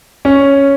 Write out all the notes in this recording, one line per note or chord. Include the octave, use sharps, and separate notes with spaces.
C#4